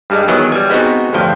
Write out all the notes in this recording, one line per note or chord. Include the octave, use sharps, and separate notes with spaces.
G2 G3 G#3
D#3 E3 F#3 G#3 B3 E4
G3 G#5
G#3 B3 C4 D#4 F#4
A1 D2 G2 F3 G5